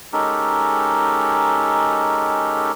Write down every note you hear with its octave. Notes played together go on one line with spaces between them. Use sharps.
G#3 C#4 D#4 G4 A4 A#4